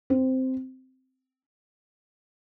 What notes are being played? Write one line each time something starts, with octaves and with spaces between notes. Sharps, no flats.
C4